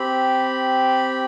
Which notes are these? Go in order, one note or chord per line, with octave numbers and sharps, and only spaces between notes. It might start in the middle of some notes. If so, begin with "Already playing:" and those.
Already playing: C4 G4 B5